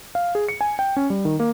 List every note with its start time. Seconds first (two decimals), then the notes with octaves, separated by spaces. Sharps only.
0.15 F5
0.35 G#4
0.49 C#7
0.61 G#5
0.79 G5
0.97 C#4
1.10 G3
1.25 D#3
1.40 A#3